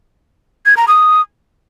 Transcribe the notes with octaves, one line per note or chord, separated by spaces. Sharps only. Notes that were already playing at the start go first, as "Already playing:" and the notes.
G#6
A#5
D#6